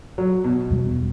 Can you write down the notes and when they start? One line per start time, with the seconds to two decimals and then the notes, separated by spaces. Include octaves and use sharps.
0.18 F#3
0.44 B2
0.70 E2 B2 G3